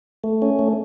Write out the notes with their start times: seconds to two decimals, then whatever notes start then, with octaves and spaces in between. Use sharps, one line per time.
0.24 A3
0.42 C#4
0.59 A3